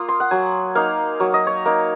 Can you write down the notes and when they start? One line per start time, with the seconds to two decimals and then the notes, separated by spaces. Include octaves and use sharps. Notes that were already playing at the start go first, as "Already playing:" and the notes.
Already playing: A#3 F4 D#6
0.08 C6
0.20 F#5
0.31 F#3 G#5
0.75 A#3 D#4 F5
1.20 F#3 C#5
1.34 D#5
1.47 C#5
1.65 A#3 D#4